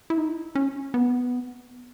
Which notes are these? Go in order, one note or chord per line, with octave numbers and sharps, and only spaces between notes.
E4
D#4
C#4
B3